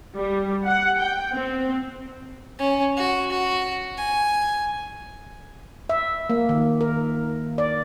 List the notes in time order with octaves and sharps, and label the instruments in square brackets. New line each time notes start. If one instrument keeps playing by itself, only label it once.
[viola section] G3
F#5
G5
C4
[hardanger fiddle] C#4
F#4
F#4
G#5
[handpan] E5
A#3
D#3
A#4
D5